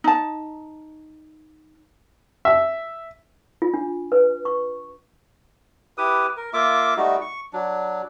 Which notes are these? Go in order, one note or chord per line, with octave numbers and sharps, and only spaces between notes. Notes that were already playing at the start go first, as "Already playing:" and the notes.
D#4 A5
E5
F4
D4
B4
C#6
E4 G4 B4 D#6
A#4
A#3 F4 E5 D6
G3 A3 D#4 F#4
C#6
F#3 D4